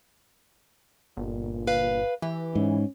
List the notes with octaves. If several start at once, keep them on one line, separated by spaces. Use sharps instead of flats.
G1 A#2
B4 F5
E3 G4
G#2 C#4